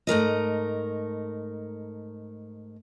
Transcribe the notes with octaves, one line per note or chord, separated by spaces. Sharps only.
G#2 A3 A#4 D#5